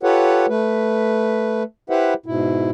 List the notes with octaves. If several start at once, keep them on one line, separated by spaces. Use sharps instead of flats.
F4 G4 A4 B4 C#5 F#5
A3 B4
E4 G4 B4 C5 E5 F#5
G#2 B2 E4